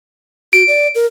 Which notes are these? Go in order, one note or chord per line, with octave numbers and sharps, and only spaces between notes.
F#4 D7
D5
A#4